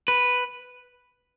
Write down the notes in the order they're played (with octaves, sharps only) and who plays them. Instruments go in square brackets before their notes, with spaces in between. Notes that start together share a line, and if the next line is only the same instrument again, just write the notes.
[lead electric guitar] B4